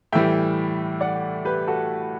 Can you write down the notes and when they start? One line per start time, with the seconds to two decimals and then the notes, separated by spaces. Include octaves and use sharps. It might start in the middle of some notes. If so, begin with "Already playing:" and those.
0.12 A2 E3 G3 E5 G5
1.01 D5 F#5
1.45 G4 B4
1.67 F#4 A4